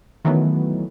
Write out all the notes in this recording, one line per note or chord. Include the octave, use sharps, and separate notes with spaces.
D#3 E3 F#3 A3 B3